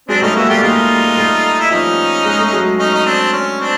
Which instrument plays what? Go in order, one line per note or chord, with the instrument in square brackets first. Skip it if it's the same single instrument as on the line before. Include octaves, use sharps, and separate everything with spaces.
[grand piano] F#3 G#3 [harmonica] C4 D4
[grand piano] G3 A3 [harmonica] C#4 D#4
[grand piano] G#3 A#3 [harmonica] E4 F#4
[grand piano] G3 A3 [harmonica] F4 G4
[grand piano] G#3 A#3 [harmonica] D#4 F4
[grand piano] G3
G#3
G3 A3
[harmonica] E4
[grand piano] F3 G3 [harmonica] C#4 D#4
[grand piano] G#3
A3
F#3 G#3
[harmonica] C#4 D#4
D#4
C4 D4
C#4
C4 D4